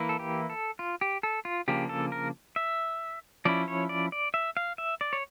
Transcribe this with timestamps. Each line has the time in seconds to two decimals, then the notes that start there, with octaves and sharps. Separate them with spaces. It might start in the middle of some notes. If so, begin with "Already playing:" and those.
Already playing: E3 A#3 E4
0.09 A4
0.19 G4
0.50 A4
0.79 F4
1.01 G4
1.23 A4
1.45 F4
1.68 C#3 F3 A#3 D4 G4
1.89 A4
2.12 A#4
2.56 E5
3.45 F3 C#4 E4 D5
3.68 C#5
3.89 D5
4.12 D5
4.34 E5
4.57 F5
4.78 E5
5.01 D5
5.13 C#5